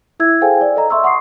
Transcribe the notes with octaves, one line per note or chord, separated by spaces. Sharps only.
E4 E5 E6 G#6
G#4 A4 C5 F5 G5 G#5
D5
A4 D#5 A#5
E5 C6 C#6 E6
F#5 C6 C#6 D#6 C7